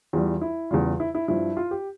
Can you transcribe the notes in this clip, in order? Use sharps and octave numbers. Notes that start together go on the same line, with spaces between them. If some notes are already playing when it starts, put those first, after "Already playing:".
E2 E3 G3 F4
E4
E2 C#3 G3 F4
E4
E4
G2 F3 E4
F4
G4